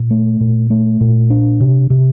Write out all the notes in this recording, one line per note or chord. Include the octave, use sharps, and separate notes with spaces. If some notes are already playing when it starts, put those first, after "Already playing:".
Already playing: A#2
A3
A#2
A3
A#2
D4
C3
C3